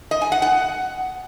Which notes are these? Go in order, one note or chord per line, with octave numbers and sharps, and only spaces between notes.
D#5
G#5
F#5
F#5